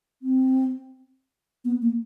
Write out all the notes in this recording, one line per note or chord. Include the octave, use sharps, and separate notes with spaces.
C4
B3
A#3